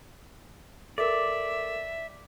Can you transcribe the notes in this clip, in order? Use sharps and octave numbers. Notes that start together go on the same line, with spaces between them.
A4 A#4 D5 E5